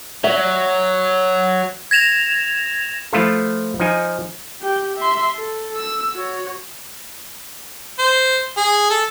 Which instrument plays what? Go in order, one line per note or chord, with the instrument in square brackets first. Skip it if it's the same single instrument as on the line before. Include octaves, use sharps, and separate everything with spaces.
[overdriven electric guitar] F#3 [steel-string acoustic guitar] E5
[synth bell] G#6 A#6 E7 F7
[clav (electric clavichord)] F3 A3 E4 F4 A4
F3 D#4 G#5
[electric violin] G4 G5
E5 C6
A4
E6
F#4 C#5
[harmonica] C5
G#4
A4